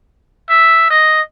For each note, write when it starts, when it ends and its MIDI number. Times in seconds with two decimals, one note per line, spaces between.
0.49 0.90 76
0.90 1.20 75